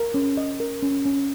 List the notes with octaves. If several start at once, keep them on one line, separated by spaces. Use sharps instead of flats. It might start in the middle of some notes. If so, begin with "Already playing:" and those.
Already playing: A#4
C#4
D#5
A#4
C#4
C#4